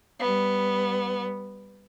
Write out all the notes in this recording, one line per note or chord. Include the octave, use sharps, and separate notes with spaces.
G3 B3